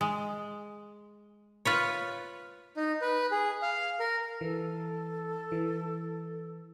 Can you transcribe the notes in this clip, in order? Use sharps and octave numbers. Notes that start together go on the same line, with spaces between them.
G#3
F4 B4 C#5
D#4
B4
G#4
F5
A#4
E3 A4
E3